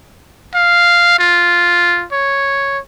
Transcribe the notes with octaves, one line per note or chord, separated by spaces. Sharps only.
F5
F4
C#5